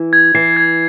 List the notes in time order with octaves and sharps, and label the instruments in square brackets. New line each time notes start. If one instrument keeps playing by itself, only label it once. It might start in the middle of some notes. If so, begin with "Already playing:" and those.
Already playing: [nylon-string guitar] E3
[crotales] G#6
[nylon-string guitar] E3 [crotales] C7
[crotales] G#6